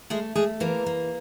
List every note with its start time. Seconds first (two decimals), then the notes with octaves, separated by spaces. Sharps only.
0.10 G#3 A3 G#4
0.35 G#3 A3 G#4
0.60 E3 A#3 A#4
0.86 A#3